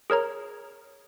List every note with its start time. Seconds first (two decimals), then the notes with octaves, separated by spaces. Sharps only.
0.10 G#4 A#4 C#5 A#5